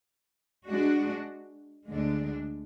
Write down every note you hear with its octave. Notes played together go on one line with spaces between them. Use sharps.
G#3 D4 F#4
D2 D3 G#3 D4